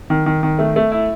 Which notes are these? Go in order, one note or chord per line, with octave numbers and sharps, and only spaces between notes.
D#3
D#3
D#3
A3
A3
E4